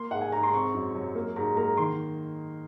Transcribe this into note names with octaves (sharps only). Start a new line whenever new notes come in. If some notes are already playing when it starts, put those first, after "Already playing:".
Already playing: A#3 C6
G#2 F#5
G#5
G#2 A#5
C6
C4 C#6
F#2
F#3
A#3
G#2 A#5
A#3 A#5
D#3 C6